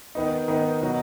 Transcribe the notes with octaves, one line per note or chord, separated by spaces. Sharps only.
D#3 B3 D#4
D#3 B3 D#4
B2 F#3 D#4 F#4